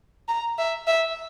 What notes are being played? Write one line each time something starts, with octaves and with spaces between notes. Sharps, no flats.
A#5
E5
E5